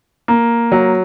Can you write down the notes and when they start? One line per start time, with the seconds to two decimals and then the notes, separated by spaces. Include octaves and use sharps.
0.28 A#3
0.72 F#3